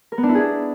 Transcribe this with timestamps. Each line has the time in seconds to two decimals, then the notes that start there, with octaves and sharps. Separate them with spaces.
0.12 A#4
0.18 B3
0.23 D4
0.29 E4
0.35 G#4